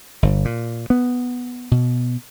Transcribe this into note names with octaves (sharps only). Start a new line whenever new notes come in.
G1
A#2
B3
B2